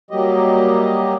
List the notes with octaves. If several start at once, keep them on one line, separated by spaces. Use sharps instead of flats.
F#3 G3 A#3 G4 D#5